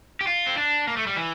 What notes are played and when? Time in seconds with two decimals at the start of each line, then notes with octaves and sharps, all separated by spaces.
0.21 G4
0.27 F4
0.47 C4
0.57 D4
0.87 A#3
0.97 A3
1.07 G3
1.16 E3